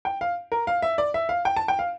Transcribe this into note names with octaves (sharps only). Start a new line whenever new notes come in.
G5
F5
A#4
F5
E5
D5
E5
F5
G5
A5
G5
F5